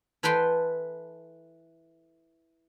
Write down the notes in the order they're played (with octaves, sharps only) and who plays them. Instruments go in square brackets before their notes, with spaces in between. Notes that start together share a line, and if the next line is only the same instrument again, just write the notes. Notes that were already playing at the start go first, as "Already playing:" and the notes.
[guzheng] E3 A4 B4 G5 C6